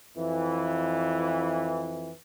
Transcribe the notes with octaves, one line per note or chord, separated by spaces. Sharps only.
F2 E3